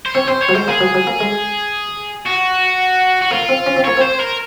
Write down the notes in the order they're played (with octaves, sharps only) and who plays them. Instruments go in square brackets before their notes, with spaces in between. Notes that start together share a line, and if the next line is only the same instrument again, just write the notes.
[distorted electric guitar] C5
[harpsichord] C4 [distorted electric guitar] C#5
[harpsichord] C4 [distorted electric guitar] C5
[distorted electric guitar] C#5
[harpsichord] F#3
[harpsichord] G#3 [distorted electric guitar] C5
[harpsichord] A#3 [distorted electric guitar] G#4
[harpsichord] F#3
F#3
A#3
G#3
[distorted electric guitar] F#4
F#4
[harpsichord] A#3 [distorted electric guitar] F4
[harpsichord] C4
C#4
C4
[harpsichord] A#3 [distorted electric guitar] C#5
[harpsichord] C4 [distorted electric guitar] C5
[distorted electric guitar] A#4